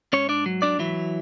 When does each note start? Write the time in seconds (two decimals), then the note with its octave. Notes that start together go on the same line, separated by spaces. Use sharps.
0.13 G#2 C#4 C#5
0.29 D4 D5
0.46 F#3
0.62 D4 D5
0.79 E3 F#3 E4